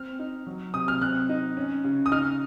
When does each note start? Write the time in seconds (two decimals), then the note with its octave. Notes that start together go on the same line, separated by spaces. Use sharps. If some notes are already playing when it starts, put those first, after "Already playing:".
Already playing: C4 F6
0.19 D#4
0.47 F#3
0.74 C3 D#6
0.88 F6
1.01 C4 F#6
1.29 D#4
1.57 C#4
1.84 C#3
2.06 D#6
2.12 D#4 F6